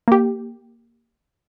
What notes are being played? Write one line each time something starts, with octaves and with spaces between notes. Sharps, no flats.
A#3 G4